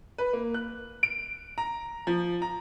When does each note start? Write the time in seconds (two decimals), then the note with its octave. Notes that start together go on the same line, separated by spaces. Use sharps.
0.18 B4
0.33 A#3
0.54 F#6
1.03 D7
1.58 A#5
2.07 F3
2.42 A#5